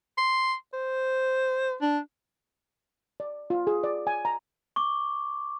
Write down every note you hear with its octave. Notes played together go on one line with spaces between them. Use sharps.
C6
C5
D4
D5
F4
G#4
D5
G#5
A#5
C#6 D6